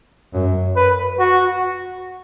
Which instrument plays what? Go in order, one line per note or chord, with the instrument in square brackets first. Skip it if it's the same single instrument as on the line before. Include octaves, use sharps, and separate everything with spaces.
[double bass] F#2
[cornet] B4
F#4